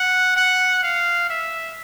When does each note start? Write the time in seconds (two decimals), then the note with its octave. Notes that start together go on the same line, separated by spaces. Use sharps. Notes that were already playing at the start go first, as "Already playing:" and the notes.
Already playing: F#5
0.36 F#5
0.83 F5
1.30 E5